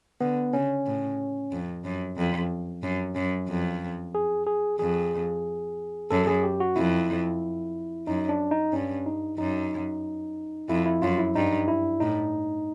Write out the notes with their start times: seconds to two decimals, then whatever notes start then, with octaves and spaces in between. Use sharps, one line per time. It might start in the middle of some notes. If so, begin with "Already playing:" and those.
0.21 D3 B3
0.53 C#3 C#4
0.86 A2
1.52 F2
1.85 F#2
2.17 F2
2.83 F#2
3.16 F#2
3.49 F2
4.15 G#4
4.47 G#4
4.79 F2 G#4
6.11 F#2 A4
6.27 G#4
6.43 G4
6.60 F#4
6.76 F2 E4
8.07 F#2 D#4
8.29 D4
8.51 D#4
8.73 G2 C#4
9.06 D#4
9.38 F#2 D#4
10.69 F2 E4
10.86 E4
11.02 F#2 F4
11.18 E4
11.35 G2 D#4
11.68 E4
12.00 A2 D#4